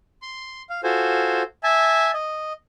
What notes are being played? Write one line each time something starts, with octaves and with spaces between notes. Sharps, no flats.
C6
F5
F4 F#4 A4 C5 G#5
E5 G#5 A5
D#5